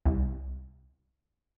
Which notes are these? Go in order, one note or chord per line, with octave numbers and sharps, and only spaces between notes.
C2